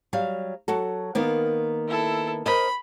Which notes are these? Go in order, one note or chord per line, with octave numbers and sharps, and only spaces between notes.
F#3 G3 F5
F#3 F#4 A4
D#3 A#3 B3
E4 A4
A#4 C5 D#5 B5